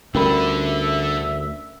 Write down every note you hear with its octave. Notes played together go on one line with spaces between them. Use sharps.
D2 D3 G3 C#4 D4 A#4 E5 B5